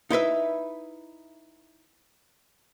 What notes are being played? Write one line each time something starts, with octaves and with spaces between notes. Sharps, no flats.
D#4 E4 B4 E5